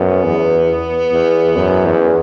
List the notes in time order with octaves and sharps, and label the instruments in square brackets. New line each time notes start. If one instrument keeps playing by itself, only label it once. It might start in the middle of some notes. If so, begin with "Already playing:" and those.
Already playing: [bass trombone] F#2 [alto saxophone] B3
[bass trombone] E2
E2
F#2
E2